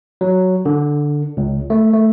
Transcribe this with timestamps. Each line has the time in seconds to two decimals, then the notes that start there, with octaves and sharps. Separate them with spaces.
0.21 F#3
0.65 D3
1.37 C#2
1.70 A3
1.93 A3